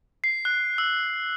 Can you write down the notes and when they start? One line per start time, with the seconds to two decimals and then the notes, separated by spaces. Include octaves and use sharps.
0.24 C7
0.45 F#6
0.78 E6